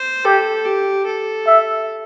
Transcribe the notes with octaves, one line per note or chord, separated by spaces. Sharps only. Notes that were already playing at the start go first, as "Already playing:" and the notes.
Already playing: C5
G4 A4
G4
A4
E5